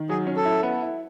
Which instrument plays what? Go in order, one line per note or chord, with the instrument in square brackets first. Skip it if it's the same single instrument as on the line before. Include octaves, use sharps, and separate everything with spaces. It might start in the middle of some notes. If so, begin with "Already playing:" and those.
Already playing: [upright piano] D#3
[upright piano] F#3 [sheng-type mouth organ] G#4
[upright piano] C#4
[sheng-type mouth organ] A4
[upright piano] E4
B3
E4